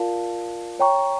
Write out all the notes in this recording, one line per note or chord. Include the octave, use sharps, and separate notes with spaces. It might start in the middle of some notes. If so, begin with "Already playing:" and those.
Already playing: F4 A#4 D5 F5 A5
C#5 G5 A#5 C#6